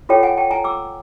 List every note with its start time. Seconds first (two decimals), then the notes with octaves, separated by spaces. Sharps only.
0.09 F4 A4 C#5 G5 A5
0.23 F#5 G#5
0.37 G5 A5
0.51 G#5 A#5
0.64 D6 E6